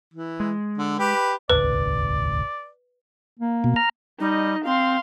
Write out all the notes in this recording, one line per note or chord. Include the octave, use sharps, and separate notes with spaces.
E3
G#3
D3
G4 B4
D#1 G#1 C#2 B4 D5
A#3
B2
A#5 F6
G3 D#4 D#5
C4 F5 C6